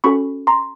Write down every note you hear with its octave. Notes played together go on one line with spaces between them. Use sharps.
C#4 F#4 A4 B5 C#6
A#5 C6